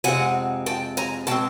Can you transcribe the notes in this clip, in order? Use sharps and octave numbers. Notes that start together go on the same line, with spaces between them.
F2 C3 F3 G#3 C4 F#5 G#5
G5 A5
G#5 A#5
B2 G#3 C4 G5 A5